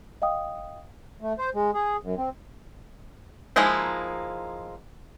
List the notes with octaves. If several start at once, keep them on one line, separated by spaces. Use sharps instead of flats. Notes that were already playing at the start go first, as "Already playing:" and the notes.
D#5 F5 G5 D#6
A3
C5
G#3
G#4
F#2
C4
F3 G#3 A#3 D#4 E4